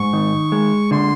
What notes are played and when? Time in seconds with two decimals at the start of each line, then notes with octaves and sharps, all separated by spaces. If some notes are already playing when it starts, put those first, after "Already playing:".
Already playing: G#2 C#6
0.13 D#3
0.52 G#3
0.91 D3 C6